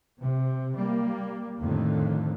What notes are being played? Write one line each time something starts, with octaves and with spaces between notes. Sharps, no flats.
C3
G3 A#3
F2 A2 D3 D#3